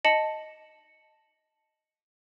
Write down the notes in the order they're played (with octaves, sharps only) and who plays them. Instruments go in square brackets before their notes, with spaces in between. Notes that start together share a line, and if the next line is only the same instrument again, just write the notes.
[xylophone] D#5 A5 C#7 F#7